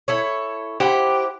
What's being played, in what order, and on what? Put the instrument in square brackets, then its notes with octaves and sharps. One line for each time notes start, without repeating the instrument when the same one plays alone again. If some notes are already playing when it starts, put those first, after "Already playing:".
[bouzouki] E4 A4 C#5
[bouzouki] E4 C5 F#5 [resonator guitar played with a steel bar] G4